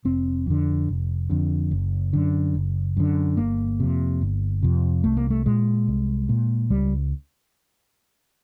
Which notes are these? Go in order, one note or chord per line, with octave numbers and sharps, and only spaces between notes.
F1 C4
F2 D3
F1
F2 D3
F#1
F#2 D3
F#1
F#2 D3
G1 A#3
F2 C3
G1
F2 C3
C2 A3
A#3
A3
A#2 G#3
C2
A#2
C#2 G3